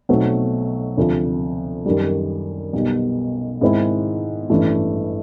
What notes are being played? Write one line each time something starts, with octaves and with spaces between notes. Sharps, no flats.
B1 B2 F#3 A3 C4
D2 C3 F3
F#2 D#3 G3
B1 B2 G3
G#2 D#3 G#3 C4 E4
A1 G2 E3 A3